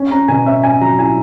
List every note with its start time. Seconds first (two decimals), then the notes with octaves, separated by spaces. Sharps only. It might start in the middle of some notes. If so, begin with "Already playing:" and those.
Already playing: C#4
0.11 C#4 A#5
0.28 B2 G#5
0.46 C#4 E5
0.63 C#4 G#5
0.81 F#3 A#5
0.99 E4 G#5